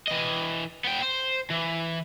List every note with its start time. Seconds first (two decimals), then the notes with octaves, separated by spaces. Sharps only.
0.08 E3 D#5
0.85 B3 G5
1.02 C5
1.51 E3